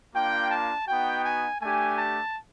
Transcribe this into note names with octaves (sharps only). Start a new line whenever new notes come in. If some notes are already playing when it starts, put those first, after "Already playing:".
A#3 D4 F4 G5
A5
B3 D#4 F#4 G5
G#5
A3 D4 G4 G#5
A5